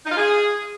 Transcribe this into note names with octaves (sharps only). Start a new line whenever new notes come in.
D#4
F4
G#4